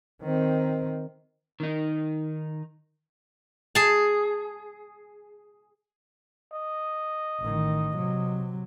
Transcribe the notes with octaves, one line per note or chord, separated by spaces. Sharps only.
D#3 C4
D#3 D#4
G#4 A5
D#5
A1 D#3
C3 F#3